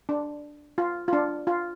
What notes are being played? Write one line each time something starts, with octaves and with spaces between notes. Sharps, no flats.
D4
F4
F4
D4
F4